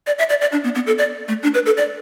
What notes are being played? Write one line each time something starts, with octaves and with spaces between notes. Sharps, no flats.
D5
E5
D5
D5
D4
B3
B3
A4
D5
A3
D4
B4
A4
D5